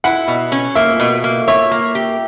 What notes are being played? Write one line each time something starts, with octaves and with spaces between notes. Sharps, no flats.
E4 F#5
B2
C#4
A#3 E5
B2
A#3
C#5 E5
A#3
G4